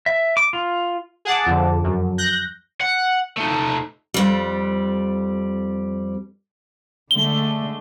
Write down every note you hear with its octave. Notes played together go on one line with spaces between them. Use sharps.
E5
D6
F4
G#4 F#5 A5 D6
F2 D3
F#2
F#6 G6 A#6
F#5
A3 D#4
F2 G3
D3 G#3 A3 G7